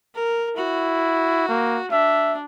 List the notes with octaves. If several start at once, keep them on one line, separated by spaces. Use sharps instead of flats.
A#4
E4 F#4
A#3
D4 E5